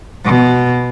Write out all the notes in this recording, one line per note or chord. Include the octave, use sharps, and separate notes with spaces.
B2